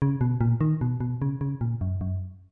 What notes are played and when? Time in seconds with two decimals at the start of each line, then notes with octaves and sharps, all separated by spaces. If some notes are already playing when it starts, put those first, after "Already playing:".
0.02 C#3
0.21 B2
0.41 A#2
0.61 D#3
0.81 B2
1.00 B2
1.22 C#3
1.41 C#3
1.61 A#2
1.81 F#2
2.01 F#2